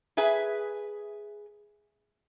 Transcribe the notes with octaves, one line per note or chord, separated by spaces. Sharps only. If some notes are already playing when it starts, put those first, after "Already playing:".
G#4 B4 E5 G#5